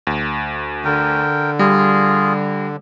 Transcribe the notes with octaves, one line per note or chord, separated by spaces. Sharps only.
D2
D3 A#4 G5
G3 F4 G#4